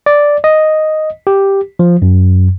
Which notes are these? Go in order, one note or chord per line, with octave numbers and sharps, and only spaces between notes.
D5
D#5
G4
F3
F#2